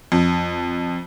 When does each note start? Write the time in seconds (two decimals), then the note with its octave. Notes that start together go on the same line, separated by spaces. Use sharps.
0.12 F2